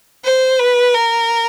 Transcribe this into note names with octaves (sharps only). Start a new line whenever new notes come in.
C5
B4
A#4